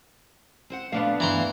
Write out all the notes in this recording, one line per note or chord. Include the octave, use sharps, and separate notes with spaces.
C4 C5 F#5
A#2 A3 B3 D4 F5
D2 G2 E3 E4 A#5 C6